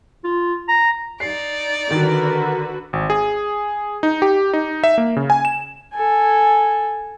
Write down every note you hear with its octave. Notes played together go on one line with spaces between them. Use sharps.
F4
A#5
D#4 D5 C7
D3 D#3 F#4 A#4 B4
G#1
G#4
D#4
G4
D#4
E5
A#3
C#3
G#5
E7
A4 G#5